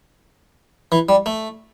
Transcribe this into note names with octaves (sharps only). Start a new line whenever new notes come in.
E3
G3
A3